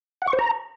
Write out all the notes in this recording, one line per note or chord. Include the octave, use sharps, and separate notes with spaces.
F#5
C#6
C5
A#5